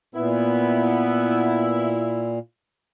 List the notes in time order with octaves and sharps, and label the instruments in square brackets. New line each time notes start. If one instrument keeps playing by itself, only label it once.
[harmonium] A#2 [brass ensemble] B3 [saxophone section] E4